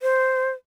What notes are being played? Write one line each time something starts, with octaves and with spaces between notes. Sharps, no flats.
C5